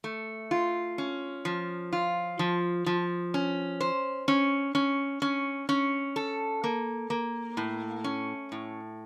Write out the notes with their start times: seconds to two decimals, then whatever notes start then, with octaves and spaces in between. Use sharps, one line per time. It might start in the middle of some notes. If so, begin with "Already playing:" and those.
0.04 A3
0.51 F4
0.98 C#4
1.45 F3
1.93 F4
2.39 F3
2.86 F3
3.34 C#4
3.81 C5
4.28 C#4
4.75 C#4
5.22 C#4
5.69 C#4
6.16 A4
6.64 A#3
7.10 A#3
7.57 A2
8.04 C#4
8.52 A2